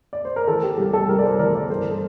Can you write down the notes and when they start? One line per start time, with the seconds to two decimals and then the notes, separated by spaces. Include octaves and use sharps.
0.13 D5
0.25 C5
0.36 A#4
0.48 E3 A4
0.63 G4
0.78 C2 G4
0.93 A4
1.08 C2 G4 A#4
1.19 D5
1.23 A4 C5
1.39 E3 A#4 D5
1.54 A#4 D5
1.70 G2 A4 C5
1.91 A4